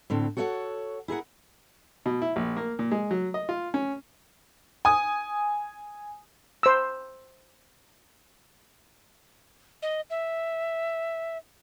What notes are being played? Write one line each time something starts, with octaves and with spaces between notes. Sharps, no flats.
A2 D3 C4
F#4 A4 C#5 D#5 F#5
E4 G#4 A#4 F#5
B2
E4
A#1
A#3
A#2
G#3
F#3
D#5
F4
C#4
G#5 D#6
C5 E6
D#5
E5